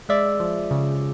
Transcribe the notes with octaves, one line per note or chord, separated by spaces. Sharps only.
G#3 D5 E5
F3
C#3